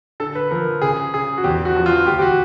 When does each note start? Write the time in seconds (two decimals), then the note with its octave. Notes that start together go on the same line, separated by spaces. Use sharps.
0.20 D3 A4
0.35 B4
0.51 F3 A#4
0.82 C#3 G#4
1.13 C#3 G#4
1.38 F#4
1.44 E2 G4
1.65 F#4
1.76 F3
1.86 F4
2.06 D2 G4
2.19 G4
2.22 F#4